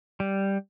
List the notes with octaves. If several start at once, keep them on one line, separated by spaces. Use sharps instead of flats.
G3